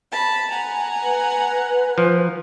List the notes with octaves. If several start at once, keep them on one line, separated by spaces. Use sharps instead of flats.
A5 B5
F#5 G#5 A#5
B4
F3